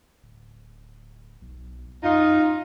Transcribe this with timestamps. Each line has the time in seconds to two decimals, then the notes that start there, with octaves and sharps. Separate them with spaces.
0.22 D1
1.41 B1
2.03 F#2 D#4 F4